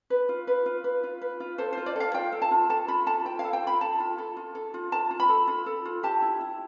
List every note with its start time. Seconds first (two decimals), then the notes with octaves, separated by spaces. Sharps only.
0.10 B4
0.29 F4
0.47 B4
0.66 F4
0.84 B4
1.04 F4
1.22 B4
1.40 F4
1.58 A4 C5
1.73 F4 C5
1.86 D5
1.96 A4 F5
2.14 F4 G5
2.32 A4
2.42 A5
2.51 F4
2.69 A4 A5
2.88 F4 B5
3.06 A4 A5
3.25 F4 G5
3.39 A4 F5
3.53 G5
3.63 F4 B5
3.81 A4 A5
4.00 F4
4.18 A4
4.37 F4
4.55 A4
4.74 F4
4.92 A4 A5
5.11 F4
5.20 B5
5.29 A4
5.48 F4
5.66 A4
5.85 F4
6.03 G4 A5
6.22 E4
6.41 E4